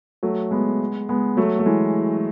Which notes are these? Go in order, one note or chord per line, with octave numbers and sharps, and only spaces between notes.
F#3 A3
G#3 B3
G#3 B3
F#3 A3
A3
E3 G#3